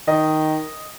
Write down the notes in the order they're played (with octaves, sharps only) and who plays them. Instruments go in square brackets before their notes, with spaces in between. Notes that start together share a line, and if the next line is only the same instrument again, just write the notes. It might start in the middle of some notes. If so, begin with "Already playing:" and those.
[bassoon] D#3 [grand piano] D#5